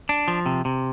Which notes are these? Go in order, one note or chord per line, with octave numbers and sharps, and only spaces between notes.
D4
F3
C3
C3